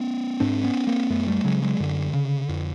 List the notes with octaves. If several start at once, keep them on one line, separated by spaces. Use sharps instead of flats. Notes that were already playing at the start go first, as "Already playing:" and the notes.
Already playing: B3 C#4
G#2 C4 D4
B3 C#4
A#3 C4
F#2 A3 B3
G3 A3
C#3 F#3 G#3
F#3 G#3
F#2 D3
C#3
F2